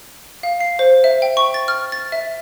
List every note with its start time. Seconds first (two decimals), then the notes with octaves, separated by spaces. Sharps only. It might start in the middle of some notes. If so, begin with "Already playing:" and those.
0.43 F5
0.60 C7
0.79 C5
1.04 E5
1.22 G5
1.37 C#6
1.54 A6
1.68 F6
1.92 A6
2.12 E5